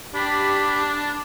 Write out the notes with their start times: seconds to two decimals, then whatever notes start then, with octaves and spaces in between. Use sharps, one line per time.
0.14 D4 G4 B5